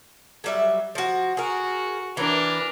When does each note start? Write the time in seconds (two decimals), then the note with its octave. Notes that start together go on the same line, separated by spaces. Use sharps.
0.44 F#3 G3 E5
0.95 F3 F#4
1.37 F#4 G#4 A#4
2.17 E3 B3 D4 A#4